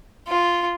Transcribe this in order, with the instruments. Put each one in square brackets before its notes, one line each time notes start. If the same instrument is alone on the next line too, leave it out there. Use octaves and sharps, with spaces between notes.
[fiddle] F4